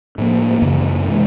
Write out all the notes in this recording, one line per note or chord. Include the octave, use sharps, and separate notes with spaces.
A2 F3 A#3
F#2 C#3 E3
C3 E3 G#3